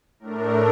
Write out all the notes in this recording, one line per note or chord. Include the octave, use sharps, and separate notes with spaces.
A2 A3 D4 A#4